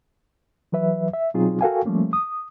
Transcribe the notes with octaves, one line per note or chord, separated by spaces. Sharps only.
E3 F#3 B4 E5
E5
B2 F#3 C4 D#4 F4 G#4
F#4 A4 A#4 F5 G5 G#5
F3 G3 A3 A#3 C#4
D#6